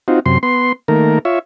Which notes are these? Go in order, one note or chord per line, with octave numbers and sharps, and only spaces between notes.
C4 D#4 F4 F#4
F#2 C3 C6
B3 C6
D#3 A3 A#3 A#4
F4 C#5 E5